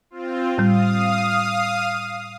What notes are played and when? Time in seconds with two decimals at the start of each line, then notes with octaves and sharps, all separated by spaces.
0.10 C4 F4
0.58 A2 G3 F5 D#6